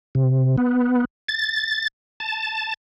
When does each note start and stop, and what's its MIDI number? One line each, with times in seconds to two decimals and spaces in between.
0.15 0.56 48
0.58 1.05 59
1.28 1.88 93
2.20 2.74 81